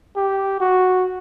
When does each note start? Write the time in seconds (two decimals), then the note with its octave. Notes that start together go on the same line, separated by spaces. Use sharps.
0.17 G4
0.61 F#4